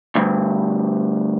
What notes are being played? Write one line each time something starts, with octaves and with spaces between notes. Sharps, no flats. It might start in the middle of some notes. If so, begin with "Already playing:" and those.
D2 G2